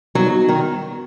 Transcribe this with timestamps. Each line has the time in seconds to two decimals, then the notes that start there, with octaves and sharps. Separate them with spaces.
0.15 F#3 G3 B3 D#4 F#4
0.49 D#3